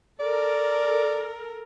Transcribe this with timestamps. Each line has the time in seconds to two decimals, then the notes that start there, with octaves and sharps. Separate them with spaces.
0.19 A4 A#4 D5